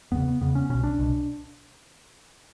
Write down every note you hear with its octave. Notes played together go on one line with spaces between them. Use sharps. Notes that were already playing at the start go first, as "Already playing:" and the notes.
E2 C#3 B3
E2 C#3 B3
C#4
C2 B2 C#4
D4
C2 B2